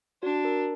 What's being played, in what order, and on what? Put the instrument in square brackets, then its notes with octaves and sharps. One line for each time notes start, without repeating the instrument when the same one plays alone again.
[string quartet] D4 [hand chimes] F#4
[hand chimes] A#4